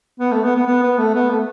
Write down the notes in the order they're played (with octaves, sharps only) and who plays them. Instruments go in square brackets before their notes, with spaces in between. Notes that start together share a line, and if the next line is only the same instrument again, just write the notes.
[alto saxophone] B3
A3
B3
B3
B3
B3
A3
B3
A3